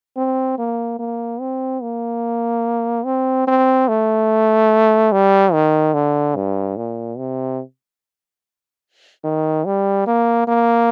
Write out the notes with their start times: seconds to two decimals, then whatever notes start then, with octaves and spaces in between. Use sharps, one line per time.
0.17 C4
0.59 A#3
0.99 A#3
1.40 C4
1.82 A#3
3.05 C4
3.47 C4
3.89 A3
5.12 G3
5.53 D#3
5.94 D3
6.36 G2
6.77 A#2
7.18 C3
9.24 D#3
9.66 G3
10.07 A#3
10.48 A#3